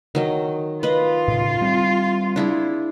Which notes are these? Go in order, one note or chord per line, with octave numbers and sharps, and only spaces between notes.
D#3 F#3 D#5
F4 B4 D#5
A2 C#3
G3 C4
D4 E4 G#4